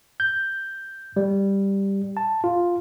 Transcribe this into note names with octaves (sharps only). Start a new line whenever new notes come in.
G6
G3
A5
F4